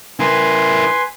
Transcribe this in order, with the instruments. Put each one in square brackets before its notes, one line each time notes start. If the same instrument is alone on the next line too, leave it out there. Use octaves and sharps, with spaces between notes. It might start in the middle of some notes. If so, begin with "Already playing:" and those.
[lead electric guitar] E4 A#4 [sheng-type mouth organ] B4 G#5 C6